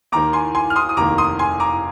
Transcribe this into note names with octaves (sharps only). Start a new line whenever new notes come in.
D#2 D#3 A#3 A#5 D6
G#5 C6
G#5 C6
F6
C6 D#6
D#6
F1 D#2 D#3 A#3 A#5 D6
C6 D#6
G#5 C6
A#5 D6